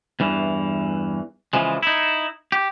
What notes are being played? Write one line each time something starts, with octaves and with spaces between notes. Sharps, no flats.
E2 G2 E3
C#3 E3 F3 G#3
D#4 E4
G4